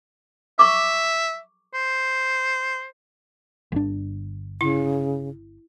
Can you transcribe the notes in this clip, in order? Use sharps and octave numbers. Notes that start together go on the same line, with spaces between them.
E5 C#6 D6
C5
G1 D4
C#3 E4